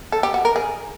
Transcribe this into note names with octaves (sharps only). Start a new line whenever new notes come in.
A4
G4
F#4
A#4
G#4